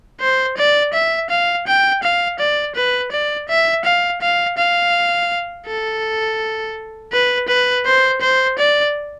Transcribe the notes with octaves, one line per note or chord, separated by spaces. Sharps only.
C5
D5
E5
F5
G5
F5
D5
B4
D5
E5
F5
F5
F5
A4
B4
B4
C5
C5
D5